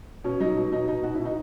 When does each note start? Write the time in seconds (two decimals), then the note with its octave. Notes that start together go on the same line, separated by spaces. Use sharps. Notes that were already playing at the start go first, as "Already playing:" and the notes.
0.24 B2 C#4
0.40 F#3 D#4
0.57 B2
0.72 B2 D#4
0.88 B2 D#4
1.04 B2 F#4
1.15 B2 E4
1.25 D#4